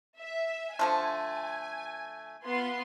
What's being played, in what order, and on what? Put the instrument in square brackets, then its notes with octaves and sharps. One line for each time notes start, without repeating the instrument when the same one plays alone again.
[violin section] E5
[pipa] D3 F3 A3 [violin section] G#5
[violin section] B3 F4 C6